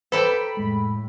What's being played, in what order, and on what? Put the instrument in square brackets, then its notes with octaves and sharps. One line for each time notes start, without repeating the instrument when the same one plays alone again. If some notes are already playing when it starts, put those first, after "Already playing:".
[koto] A4 D5 G5 [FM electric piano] B4 C5 A#5 [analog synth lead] B5
[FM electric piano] F2 G#3 [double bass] A2